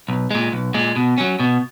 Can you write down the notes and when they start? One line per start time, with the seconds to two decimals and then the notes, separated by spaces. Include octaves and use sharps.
0.08 B1
0.31 A#2 G#3
0.52 B1
0.74 A#2 G#3
0.96 B2
1.18 F#3 C#4
1.39 B2